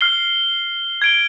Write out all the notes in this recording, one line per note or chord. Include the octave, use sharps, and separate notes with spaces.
F6 C7 G7
G#6 D7 G7